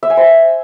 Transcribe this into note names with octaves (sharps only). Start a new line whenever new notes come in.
E5
G#5
C5